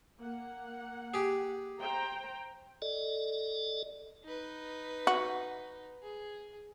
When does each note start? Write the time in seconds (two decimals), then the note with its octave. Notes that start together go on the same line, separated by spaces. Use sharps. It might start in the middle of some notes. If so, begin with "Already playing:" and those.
0.20 A#3 F#5
1.14 G4 G#4
1.80 C5 G5 A#5
2.82 A4 D5 D#5
4.25 D#4 B4
5.07 F#4
6.03 G#4